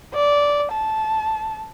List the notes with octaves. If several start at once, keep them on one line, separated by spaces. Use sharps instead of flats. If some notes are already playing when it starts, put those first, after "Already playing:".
D5
A5